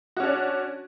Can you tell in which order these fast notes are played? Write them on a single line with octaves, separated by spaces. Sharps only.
F#4 C#4 D4